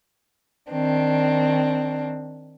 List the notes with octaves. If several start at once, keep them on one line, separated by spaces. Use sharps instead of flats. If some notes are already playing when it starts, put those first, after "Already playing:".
D#3 C4 D4